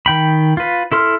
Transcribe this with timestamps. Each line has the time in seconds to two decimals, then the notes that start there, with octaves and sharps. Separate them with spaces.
0.06 D#3 G5 B5
0.57 F4 B4
0.92 E4 A4 C6 F6